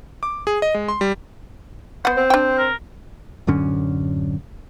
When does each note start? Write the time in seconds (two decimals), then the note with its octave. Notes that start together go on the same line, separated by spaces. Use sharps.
0.23 D6
0.47 G#4
0.62 D#5
0.74 G#3
0.88 C6
1.01 G3
2.05 B3 C5 F#5
2.17 C4
2.30 D4 G5
2.58 A#4
3.47 D1 F#2 D3 C#4